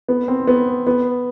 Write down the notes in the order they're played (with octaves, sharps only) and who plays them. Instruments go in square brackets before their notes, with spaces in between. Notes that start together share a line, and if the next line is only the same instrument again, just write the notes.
[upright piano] B3
C4
B3
B3